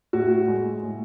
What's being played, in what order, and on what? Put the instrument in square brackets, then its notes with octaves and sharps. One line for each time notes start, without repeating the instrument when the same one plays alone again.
[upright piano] A2 F#4
G#3
A2